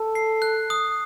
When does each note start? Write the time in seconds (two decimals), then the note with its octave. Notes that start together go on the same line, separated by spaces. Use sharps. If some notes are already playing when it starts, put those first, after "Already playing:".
Already playing: A4
0.15 C7
0.42 F#6
0.70 D#6